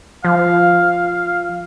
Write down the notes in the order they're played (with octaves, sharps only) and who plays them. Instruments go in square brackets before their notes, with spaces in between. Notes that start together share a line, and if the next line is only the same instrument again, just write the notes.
[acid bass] F3 [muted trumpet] F5